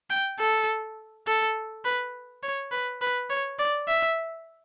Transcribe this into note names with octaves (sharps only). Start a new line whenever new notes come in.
G5
A4
A4
B4
C#5
B4
B4
C#5
D5
E5